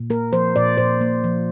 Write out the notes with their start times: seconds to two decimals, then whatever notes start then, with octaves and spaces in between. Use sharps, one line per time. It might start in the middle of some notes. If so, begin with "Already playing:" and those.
Already playing: A#2
0.10 A#3 A#4
0.32 F3 C5
0.56 A#2 D5
0.78 A#2 C5
1.01 A#3
1.24 F3